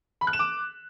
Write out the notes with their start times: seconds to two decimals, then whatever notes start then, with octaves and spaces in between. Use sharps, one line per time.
0.21 B5
0.27 F#6
0.33 E7
0.39 D6